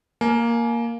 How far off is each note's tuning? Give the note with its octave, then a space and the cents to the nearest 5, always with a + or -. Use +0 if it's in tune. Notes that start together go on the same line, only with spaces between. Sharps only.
A#3 +0 G#5 +30